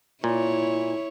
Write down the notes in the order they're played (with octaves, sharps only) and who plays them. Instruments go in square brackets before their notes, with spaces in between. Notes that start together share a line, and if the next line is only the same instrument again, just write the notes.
[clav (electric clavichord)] A#2 [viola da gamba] E4 C#5